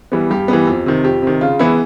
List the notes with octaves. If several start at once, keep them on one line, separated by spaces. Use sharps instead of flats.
E3 G3 B3
G2 G4
E3 G3 B3
F2
C3 D#3
F2 G4
C3 D#3
C#3 F4
E3 G#3 B3 E4